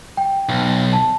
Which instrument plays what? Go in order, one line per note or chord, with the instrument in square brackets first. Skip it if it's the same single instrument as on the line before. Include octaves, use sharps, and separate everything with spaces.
[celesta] G5
[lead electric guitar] B1
[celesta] A5